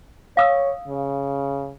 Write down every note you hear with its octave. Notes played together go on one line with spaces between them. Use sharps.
C#5 F5 D#6 E6
C#3